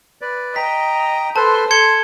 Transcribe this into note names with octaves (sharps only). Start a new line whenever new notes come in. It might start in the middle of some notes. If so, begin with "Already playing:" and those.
B4 D5
D#5 G5 A#5 B6
A4 B4 C5 A5 C6
A4 C6 G#6 C#7 G7